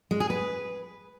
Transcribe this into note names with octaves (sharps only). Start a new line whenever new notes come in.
G#3
G#4
B4